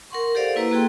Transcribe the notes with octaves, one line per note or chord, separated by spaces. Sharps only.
A#4 F#5 C6 C#6
G4 A4 C5 D5 F5 F#5
A#3 E4 B4 A#5
A#3 F#4 G#4 A4 G5 C6